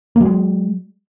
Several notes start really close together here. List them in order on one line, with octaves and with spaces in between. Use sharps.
A#3 F#3 G#3